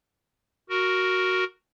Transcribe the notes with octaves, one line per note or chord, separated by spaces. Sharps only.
F#4 A#4